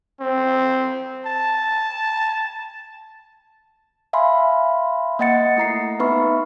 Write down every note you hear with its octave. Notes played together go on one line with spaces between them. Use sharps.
C4
A5
E5 F5 G#5 B5 C6
A#3 D#5 F#5 A6 C#7
A3 E4 A#5 C7
B3 D#4 B4 E5 B5 C#6